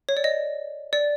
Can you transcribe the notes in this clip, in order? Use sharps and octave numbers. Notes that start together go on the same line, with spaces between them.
C#5
D5
D#5
D5